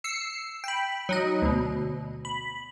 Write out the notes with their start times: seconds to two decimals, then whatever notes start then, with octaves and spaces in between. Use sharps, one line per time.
0.04 E6 C7 C#7
0.64 G5 B5
1.09 F#3 D#4 D#5
1.42 D2 B2
2.25 B5